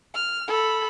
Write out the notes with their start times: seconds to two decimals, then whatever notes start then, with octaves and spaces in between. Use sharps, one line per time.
0.14 F6
0.48 A4 B5